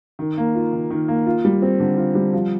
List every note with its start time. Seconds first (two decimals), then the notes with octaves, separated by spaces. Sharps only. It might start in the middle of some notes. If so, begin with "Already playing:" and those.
0.19 D#3
0.37 A#3
0.55 F4
0.73 D#3
0.90 D#3
1.08 A#3
1.26 F4
1.45 G3
1.62 C4
1.80 D3
1.97 F4
2.15 G3
2.33 F3